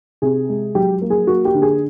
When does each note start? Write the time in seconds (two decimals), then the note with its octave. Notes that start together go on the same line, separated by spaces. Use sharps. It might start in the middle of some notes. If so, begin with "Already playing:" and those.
0.22 C3 G#4
0.49 G#3
0.75 F#3 G4
1.02 A#3
1.10 G#4
1.27 A#3 F#4
1.45 G4
1.54 D3
1.62 G#4